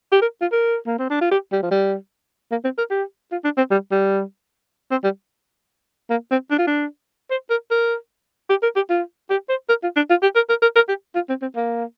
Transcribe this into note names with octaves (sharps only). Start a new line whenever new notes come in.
G4
A#4
F4
A#4
A#3
C4
D4
F4
G4
G3
F3
G3
A#3
C4
A#4
G4
F4
D4
C4
G3
G3
C4
G3
A#3
C4
D4
F4
D4
C5
A#4
A#4
G4
A#4
G4
F4
G4
C5
A#4
F4
D4
F4
G4
A#4
A#4
A#4
A#4
G4
F4
C4
C4
A#3